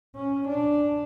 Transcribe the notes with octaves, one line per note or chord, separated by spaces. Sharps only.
C#4
D4